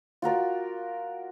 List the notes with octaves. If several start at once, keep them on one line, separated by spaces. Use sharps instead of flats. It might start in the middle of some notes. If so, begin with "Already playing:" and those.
F4 F#4 A#4 D5